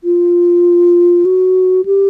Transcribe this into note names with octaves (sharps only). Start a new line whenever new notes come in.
F4
F#4
G4